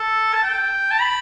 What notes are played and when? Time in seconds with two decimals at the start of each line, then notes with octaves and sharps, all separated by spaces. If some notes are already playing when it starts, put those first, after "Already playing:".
Already playing: A4
0.33 A5
0.43 G5
0.91 A5
1.00 B5